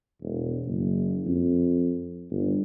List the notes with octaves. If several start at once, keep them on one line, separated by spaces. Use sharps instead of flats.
E1
F#1
F2
G1